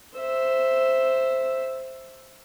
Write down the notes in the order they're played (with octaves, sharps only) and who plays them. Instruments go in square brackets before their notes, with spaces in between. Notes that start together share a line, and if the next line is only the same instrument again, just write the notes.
[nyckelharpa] C5 E5